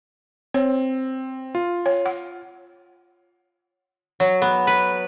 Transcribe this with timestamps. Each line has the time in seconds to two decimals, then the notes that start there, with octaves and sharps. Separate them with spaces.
0.54 C4 C#5
1.55 F4
1.86 C#5
2.06 F#5
4.20 F#3
4.42 B3
4.67 B4